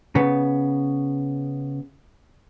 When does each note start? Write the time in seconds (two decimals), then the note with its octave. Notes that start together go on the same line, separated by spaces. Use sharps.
0.15 C#3 B3